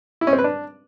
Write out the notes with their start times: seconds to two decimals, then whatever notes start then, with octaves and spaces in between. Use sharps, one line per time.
0.21 E4
0.27 C#4
0.33 C4
0.39 B4
0.44 D4